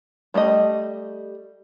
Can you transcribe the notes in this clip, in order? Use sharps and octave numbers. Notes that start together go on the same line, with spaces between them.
G3 A3 G4 D#5